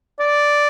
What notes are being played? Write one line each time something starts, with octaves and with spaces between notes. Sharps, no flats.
D5